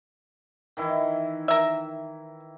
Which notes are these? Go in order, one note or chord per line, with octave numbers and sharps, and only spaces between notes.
D#3 E3 E4
A#4 E5